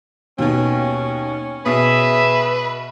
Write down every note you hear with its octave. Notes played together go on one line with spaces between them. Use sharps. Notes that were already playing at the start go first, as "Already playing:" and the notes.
D#2 B2 C#4
B2 G#4 B4 E5